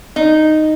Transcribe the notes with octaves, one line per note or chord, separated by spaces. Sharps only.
D#4